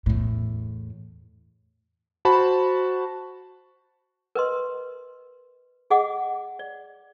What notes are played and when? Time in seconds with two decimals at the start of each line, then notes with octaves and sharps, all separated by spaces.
0.06 E2 A2
2.25 F#4 C5 A5 B5
4.35 A#4 B4 D#5 C6
5.90 G#4 D#5 F#5 D6
6.59 D5